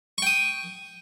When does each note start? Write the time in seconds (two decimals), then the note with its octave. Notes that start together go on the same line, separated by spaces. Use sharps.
0.18 C#6
0.22 G5
0.27 D#6